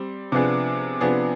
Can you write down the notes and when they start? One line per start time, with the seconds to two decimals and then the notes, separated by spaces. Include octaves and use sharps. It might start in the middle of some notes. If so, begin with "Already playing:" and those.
Already playing: G3 C4
0.32 C3 F3 B3 D4 G#4
1.01 C3 F3 B3 D4 G#4